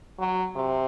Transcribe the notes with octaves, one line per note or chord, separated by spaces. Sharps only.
F#3
C3